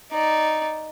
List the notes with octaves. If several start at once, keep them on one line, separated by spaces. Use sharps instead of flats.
D#4 D5